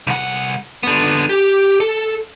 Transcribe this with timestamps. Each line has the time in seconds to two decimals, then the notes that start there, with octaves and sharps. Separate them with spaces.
0.07 C2 F#5
0.83 D3 B3
1.29 G4
1.80 A4